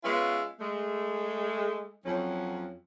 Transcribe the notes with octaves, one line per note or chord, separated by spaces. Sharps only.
G#3 B3 C#4 F4 B4 E5
G#3 A3
F2 F#3 C#4